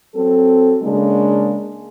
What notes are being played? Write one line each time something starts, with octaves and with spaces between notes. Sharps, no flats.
F#3 C4 A4
C#3 G#3 A#3 D4